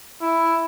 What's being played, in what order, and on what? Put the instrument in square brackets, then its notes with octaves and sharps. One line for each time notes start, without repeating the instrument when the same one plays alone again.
[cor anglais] E4